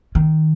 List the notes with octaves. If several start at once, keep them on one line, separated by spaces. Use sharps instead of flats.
D#3